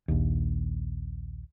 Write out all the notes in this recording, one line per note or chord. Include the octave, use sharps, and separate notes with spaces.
A#1 D#2